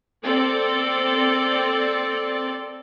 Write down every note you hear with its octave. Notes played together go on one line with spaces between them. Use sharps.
C4 A4 D5